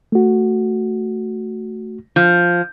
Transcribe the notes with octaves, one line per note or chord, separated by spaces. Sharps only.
A3 F#4
F3